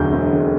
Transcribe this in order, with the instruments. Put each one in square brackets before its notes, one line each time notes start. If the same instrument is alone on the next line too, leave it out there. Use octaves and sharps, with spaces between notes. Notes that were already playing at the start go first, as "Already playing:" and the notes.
Already playing: [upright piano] E1 D2 D3 F#3 G6
E1
D3